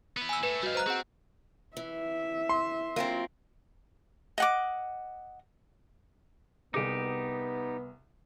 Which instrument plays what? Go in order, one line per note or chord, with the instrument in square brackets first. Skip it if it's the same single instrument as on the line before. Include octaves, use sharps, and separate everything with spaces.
[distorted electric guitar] B3 E4
[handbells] G#5 E6
[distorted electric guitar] A3 E4 [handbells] B4
[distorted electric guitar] G3 F5 [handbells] F#4 D#5
[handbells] C5 A#5 F#6
[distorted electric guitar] C4 [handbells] G#4 F#5
[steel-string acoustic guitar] E3 [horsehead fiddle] E5
[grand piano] C6
[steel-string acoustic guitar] F#3 F4 [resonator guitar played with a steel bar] A#3 C4
[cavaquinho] D#5 F#5 D6
[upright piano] C2 G#4 D6 [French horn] B3 [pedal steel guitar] D#4 G4